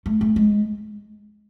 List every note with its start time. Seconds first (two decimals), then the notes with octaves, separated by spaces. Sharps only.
0.06 A3
0.21 A3
0.36 G#3